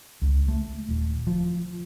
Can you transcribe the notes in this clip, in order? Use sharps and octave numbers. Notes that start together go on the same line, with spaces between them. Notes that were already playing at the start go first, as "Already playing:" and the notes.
C#2
A3
D#1
F3